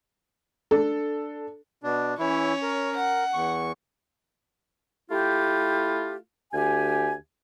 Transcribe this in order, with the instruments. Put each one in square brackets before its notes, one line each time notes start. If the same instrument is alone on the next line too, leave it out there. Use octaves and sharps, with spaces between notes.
[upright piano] D4 A4
[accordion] B2 D4
[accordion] E3 E4 [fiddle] C#4 C#5
[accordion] A#4
[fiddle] F#5
[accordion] E2 C#6
[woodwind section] A3 E4 F4 G4
D2 G4 G#5